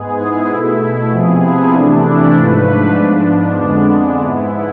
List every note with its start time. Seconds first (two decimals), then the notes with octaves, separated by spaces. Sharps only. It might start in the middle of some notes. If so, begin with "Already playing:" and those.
Already playing: G#2 G#3 B3 G#4
0.19 E4
0.50 B2 A3 E4
1.12 C3 F3 B3 G#4
1.43 E4
1.74 C3 E3 A3 D4
2.05 E4
2.36 G#2 F3 A3 B4
2.66 D4
2.97 G#2 F3 B3 D4
3.28 D4
3.59 F2 D3 G#3 B3
4.21 G#2 G#3 B3 E4